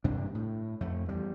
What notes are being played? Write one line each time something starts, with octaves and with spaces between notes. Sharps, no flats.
G2 C3 D4
A2
F2 A3
E2 G3